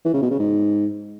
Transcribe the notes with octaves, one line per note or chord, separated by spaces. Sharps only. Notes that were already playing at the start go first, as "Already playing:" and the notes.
E3
C#3
B2
C#3
G#2